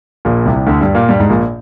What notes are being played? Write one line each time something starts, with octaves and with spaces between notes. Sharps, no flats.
A#1 A#2
C2 C3
D2 D3
G2 G3
A#2 A#3
G2 G3
G#2
A#1 A#2